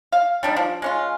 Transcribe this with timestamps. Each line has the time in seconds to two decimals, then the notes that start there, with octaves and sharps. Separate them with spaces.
0.12 F5
0.43 G3 D4 D#4
0.57 F3
0.82 G#3 C#4 F4